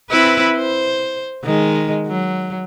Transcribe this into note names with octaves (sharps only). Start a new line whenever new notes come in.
C4 E4 B4
C5
D#3 G#3
F#3